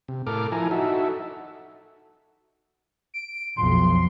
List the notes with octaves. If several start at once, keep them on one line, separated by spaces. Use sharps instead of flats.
C3
A2 A4 A#4 D6 F6
F3 E4 A4 G#5 A#5
D#4 F#4 A4 E5
D7
B1 F2 C6